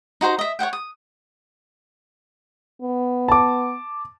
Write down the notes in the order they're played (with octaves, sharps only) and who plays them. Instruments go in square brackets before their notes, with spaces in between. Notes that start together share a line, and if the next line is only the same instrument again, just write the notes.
[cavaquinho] D#4 F#4 C5 A#5
D#5 E5
C#5 D#5 F#5 G5
D#6
[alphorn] B3
[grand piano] A5 D6